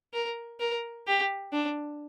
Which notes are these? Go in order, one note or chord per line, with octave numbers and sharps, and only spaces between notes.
A#4
A#4
G4
D4